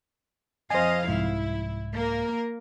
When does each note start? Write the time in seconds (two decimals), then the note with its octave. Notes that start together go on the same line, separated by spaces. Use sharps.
0.70 F2 C5 D#5 F5 G#5
1.08 C2 G#2 E4
1.93 A#3 A#4